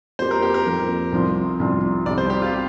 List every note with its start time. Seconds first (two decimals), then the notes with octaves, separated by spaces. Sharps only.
0.19 F2 F3 A#3 G4 C5
0.31 A#4
0.42 G4
0.54 A#4
0.66 F2 F3 A#3 G4
1.12 C2 C3 F3 C4 F4
1.60 C2 C3 F3 C4 F4
2.06 C2 C3 G3 D5
2.18 C5
2.30 G4
2.42 F4
2.53 G3